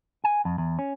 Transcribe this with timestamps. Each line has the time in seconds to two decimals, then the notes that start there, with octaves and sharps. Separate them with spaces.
0.24 G#5
0.45 F2
0.58 E2
0.79 C#4